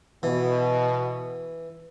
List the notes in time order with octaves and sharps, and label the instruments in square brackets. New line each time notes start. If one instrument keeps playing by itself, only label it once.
[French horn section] B2 [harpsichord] E3